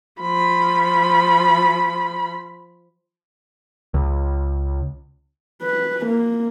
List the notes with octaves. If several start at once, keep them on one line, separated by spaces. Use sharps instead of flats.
F3 B5
C#2
B4
A#3